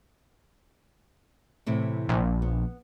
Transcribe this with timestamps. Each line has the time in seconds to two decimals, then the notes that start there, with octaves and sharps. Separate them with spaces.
1.66 A2 C3 E3
2.09 A#1
2.42 B3